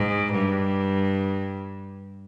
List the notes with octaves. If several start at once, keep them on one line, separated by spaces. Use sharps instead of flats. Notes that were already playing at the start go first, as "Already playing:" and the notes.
Already playing: G#2
G2